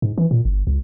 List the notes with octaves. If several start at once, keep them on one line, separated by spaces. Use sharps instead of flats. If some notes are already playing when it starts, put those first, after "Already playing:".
G#2
E3
A#2
G1
C#2